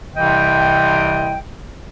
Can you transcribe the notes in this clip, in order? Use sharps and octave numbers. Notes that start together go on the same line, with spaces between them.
C2 C3 E3 D#5 G5